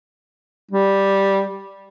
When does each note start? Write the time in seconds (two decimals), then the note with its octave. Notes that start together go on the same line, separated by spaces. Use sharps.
0.71 G3